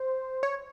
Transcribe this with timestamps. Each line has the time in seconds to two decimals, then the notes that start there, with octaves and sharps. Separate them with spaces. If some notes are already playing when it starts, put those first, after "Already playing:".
Already playing: C5
0.43 C#5